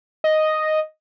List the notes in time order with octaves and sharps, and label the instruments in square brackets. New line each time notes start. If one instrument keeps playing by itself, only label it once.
[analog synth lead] D#5